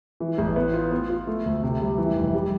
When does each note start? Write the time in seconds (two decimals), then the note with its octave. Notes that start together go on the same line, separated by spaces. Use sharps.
0.20 E3
0.38 A1
0.56 B3
0.74 F4
0.91 B3
1.10 F4
1.27 A3
1.46 D2
1.63 C3
1.81 G3
1.98 E3
2.16 F1
2.35 G3